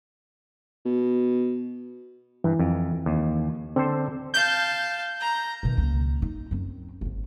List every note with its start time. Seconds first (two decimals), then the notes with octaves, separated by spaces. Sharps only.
0.85 B2
2.44 G2 E3
2.59 F2
3.06 D#2
3.76 D3 C4 A4 C5
4.34 F5 A5 G6
5.20 A#5
5.63 B2 D#3
5.77 C#2 A#3
6.22 D#4
6.51 F#2 C4
7.01 G#1 G#2